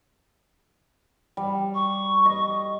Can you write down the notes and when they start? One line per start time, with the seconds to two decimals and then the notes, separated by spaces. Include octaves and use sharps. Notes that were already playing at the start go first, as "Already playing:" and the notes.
1.37 G3
1.75 C#6
2.26 D#5